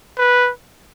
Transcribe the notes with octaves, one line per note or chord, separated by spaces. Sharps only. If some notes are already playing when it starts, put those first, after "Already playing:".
B4